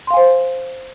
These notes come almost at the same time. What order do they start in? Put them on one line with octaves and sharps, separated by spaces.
C6 F5 G#5 C5